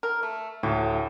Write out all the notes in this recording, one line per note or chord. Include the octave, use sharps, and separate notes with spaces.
A#4
A3
D2 A2 G4